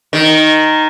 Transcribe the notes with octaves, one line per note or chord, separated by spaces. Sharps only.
D#3